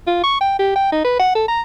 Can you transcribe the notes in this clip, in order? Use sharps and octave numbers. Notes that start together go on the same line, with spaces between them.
F4
C#6
G5
G4
G5
D#4
B4
F#5
A4
A#5